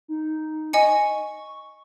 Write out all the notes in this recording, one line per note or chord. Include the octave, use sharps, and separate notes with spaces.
D#4
D#5 G#5 C#6 C#7